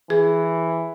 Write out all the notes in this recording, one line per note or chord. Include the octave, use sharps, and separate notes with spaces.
E3 G#4